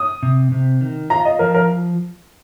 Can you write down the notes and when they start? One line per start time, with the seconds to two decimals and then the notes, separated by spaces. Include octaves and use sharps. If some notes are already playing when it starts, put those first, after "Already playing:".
Already playing: D#6
0.23 C3
0.52 C3
0.81 D#3
1.10 F4 A#5
1.25 D#5
1.39 F3 A#4
1.54 A#4